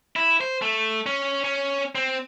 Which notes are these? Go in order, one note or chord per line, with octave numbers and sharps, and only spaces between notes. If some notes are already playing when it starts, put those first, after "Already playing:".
E4
C5
A3
C#4
C#4
C4